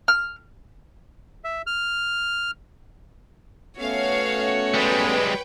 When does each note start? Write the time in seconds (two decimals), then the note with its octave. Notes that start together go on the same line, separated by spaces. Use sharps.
0.08 F6
1.44 E5
1.67 F6
3.79 A3 B3 C#4 F#4 C#5 F5
4.74 G3 G#3 B4 G5